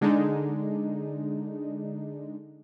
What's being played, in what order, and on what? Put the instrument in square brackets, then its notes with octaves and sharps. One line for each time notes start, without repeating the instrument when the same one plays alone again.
[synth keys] D3 G#3 D4 D#4